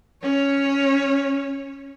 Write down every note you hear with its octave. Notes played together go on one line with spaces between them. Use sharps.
C#4 C#5